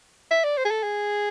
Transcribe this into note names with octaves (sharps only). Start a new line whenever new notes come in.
E5
D5
C5
G#4
A4
G#4